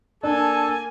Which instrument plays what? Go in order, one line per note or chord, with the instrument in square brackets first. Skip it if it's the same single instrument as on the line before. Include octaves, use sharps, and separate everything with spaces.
[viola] A#3 G#5 [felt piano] D4 [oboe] A4